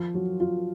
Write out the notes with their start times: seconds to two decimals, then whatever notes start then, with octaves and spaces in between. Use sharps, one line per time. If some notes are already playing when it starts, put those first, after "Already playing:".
Already playing: F3 F4
0.14 F#3
0.40 F4